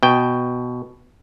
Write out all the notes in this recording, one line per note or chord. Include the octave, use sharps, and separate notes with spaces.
B2 G5